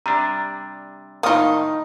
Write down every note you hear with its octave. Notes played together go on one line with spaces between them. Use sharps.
C3 G3 D4 A#5
A2 D#3 A#3 D#4 F4 D#6